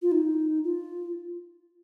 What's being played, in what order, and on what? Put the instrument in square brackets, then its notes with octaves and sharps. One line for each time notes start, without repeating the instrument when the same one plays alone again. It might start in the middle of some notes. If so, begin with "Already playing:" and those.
[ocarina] F4
D#4
F4